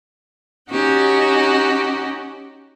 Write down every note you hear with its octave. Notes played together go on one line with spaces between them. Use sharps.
C#4 D#4 F#4 G4